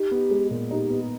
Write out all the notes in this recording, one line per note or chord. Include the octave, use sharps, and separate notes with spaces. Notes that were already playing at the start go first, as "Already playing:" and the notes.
Already playing: D#4 G4
B3
G#3
A#2
D#4 G4
B3